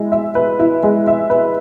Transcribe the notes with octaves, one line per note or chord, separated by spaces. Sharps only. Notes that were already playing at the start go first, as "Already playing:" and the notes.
Already playing: G#3 E4
E5
B4
E4
G#3
E5
B4